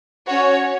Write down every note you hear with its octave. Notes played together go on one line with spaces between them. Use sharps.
C#4 F#4 C#5